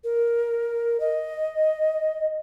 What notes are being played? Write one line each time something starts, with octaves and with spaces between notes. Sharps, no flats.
A#4
D#5